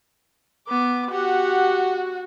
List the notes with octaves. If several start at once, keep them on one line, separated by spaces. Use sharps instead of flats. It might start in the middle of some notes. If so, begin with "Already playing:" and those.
B3 D6
F#4 G4 F#5